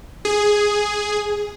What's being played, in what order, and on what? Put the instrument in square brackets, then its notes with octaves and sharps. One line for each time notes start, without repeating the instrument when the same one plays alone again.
[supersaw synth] G#4